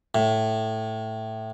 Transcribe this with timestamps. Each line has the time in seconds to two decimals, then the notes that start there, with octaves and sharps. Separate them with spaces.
0.15 A2